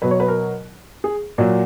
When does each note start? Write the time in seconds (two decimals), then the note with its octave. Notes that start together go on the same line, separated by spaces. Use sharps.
0.02 B2 F#3 B4
0.11 C#5
0.20 B4
0.28 A#4
1.04 G#4
1.38 A#2 F#3 F#4